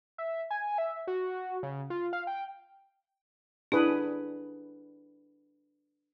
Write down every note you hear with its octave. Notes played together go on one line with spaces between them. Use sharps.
E5
G#5
E5
F#4
C#3
F4
F5
G5
D4 E4 G#4 B4